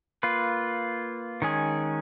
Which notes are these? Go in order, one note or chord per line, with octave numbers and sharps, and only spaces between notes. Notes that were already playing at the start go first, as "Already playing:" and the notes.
A#3 F4 B4
D#3 G#3 C#4 G#4